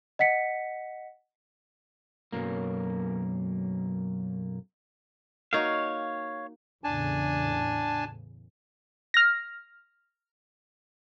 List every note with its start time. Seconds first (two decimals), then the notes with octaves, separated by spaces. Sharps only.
0.19 D#5 F#5 B6 C#7
2.32 B1 F#2 A#3
5.53 A#3 D#4 F#4 C#5 F5
6.84 E2 A2 C#3 D4 G#5 A5
9.14 F6 A#6